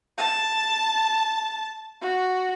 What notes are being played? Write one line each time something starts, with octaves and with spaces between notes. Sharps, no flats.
A5
F#4